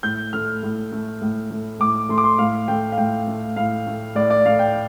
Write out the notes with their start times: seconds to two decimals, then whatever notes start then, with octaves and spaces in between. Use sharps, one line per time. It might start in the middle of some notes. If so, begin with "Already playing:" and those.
0.03 A2 G6
0.33 A3 F6
0.63 A2
0.92 A3
1.22 A2
1.51 A3
1.80 A2 D6
2.09 A3 C6
2.18 D6
2.24 C6
2.39 A2 F5
2.68 A3 G5
2.92 F5
2.98 A2 G5
3.28 A3
3.56 A2 F5
3.87 A3
4.16 A2 D5
4.30 D5
4.46 A3 F5
4.59 G5